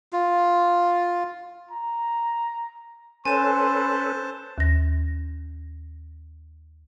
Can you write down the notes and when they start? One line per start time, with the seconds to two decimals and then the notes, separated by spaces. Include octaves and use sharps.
0.13 F4
1.71 A#5
3.25 C#4 A4 B4 C5 G#5 A5 C6 E7
4.58 D#2 A#6